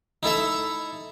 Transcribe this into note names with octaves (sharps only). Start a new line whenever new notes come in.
D#4 E4 A4 E5